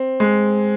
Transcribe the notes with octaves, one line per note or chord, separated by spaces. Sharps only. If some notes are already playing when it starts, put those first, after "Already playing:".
Already playing: C4
G#3